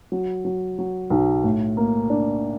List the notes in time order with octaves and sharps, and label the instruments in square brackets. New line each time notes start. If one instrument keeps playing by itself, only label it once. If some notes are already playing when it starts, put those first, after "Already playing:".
[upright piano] F#3
F#3
F#3
B1
A2
A#3
D4